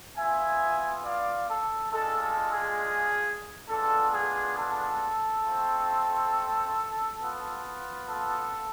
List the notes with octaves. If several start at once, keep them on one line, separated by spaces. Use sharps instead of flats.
B3 F4 E5 G#5
D5 F5
A4
G#3 D4 F4 A4
A4
G#4
G#3 B3 D4 F4 A4
G#4
A4
A3 C4 F4
B3 F4
A4